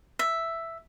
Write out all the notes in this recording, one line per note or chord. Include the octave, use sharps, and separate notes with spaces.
E5